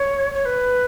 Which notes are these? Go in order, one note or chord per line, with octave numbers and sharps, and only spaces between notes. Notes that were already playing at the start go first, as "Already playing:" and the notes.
Already playing: C#5
C#5
B4